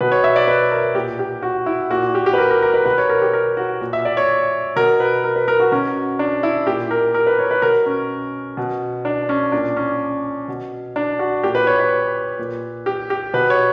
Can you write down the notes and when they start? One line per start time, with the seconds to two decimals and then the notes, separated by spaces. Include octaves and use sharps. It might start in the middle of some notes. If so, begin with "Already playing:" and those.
0.01 B2 B4
0.12 C#5
0.24 E5
0.36 D5
0.48 B4
0.71 A#4
0.95 A#2 G4
1.19 G4
1.42 F#4
1.66 E4
1.90 A#2 F#4
2.15 G4
2.26 G4
2.33 B4
2.38 A#4
2.51 A#4
2.62 A#4
2.74 B4
2.85 B2 B4
2.98 C#5
3.09 A#4
3.22 G4
3.33 A#4
3.57 F#4
3.81 A#2
3.93 E5
4.05 D5
4.17 C#5
4.76 B2 A#4
5.00 B4
5.24 A#4
5.36 B4
5.48 A#4
5.60 F#4
5.71 B2 C#4
6.19 D4
6.43 E4
6.67 A#2 G4
6.91 A#4
7.14 A#4
7.27 B4
7.39 C#5
7.51 B4
7.62 B2 A#4
7.86 C#4
8.57 B2
9.05 D4
9.29 C#4
9.52 A#2 D4
9.76 C#4
10.48 B2
10.96 D4
11.19 F#4
11.43 A#2 G4
11.55 B4
11.67 C#5
11.79 B4
12.39 A#2
12.86 G4
13.10 G4
13.34 B2 B4
13.50 C#5